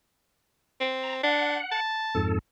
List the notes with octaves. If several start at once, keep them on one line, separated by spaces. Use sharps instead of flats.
C4
A#5
D4 F#5
A5
F2 G#2 A4